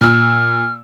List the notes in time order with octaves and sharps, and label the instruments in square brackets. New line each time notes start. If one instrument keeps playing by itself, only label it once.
[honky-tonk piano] A#2 E6 [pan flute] F6